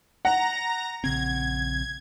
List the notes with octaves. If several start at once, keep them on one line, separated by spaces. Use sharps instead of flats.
F#5 A#5 A#6
A#1 C#3 C4 G#6